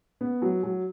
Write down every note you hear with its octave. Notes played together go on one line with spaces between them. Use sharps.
B3
F#3
F#3